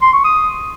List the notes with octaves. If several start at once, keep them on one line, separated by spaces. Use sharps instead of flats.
C6
C#6
D#6